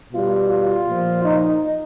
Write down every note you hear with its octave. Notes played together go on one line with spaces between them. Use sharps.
B2 G3 F4
F4
A#2 F3
D#4